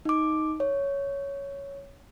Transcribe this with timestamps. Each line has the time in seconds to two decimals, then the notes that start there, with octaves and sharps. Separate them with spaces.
0.05 D#4 D6
0.60 C#5